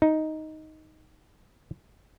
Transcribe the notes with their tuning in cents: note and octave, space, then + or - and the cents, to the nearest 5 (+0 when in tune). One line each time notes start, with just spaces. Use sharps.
D#4 +5